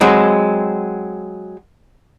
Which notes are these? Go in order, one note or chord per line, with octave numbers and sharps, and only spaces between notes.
F#3 G#3 C4